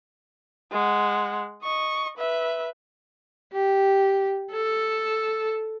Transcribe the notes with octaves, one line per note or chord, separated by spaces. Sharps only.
G#3 F#5
D#5 C#6
B4 E5
G4
A4